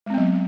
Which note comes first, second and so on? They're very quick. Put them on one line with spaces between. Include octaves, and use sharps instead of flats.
G#3 C4 B3 F#3